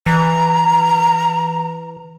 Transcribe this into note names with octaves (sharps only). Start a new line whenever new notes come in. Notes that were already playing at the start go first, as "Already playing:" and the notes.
E3 A#5